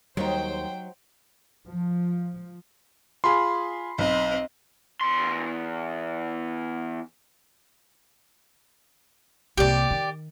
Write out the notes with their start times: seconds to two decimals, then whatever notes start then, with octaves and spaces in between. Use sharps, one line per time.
0.17 D#2 F#3 G3 D#4 C5 G5
1.68 F3
3.24 F4 G#4 B5 C6
3.98 B1 C4 D#5
5.01 E2 C6
9.57 C2 A#3 G4 D5
9.91 D#3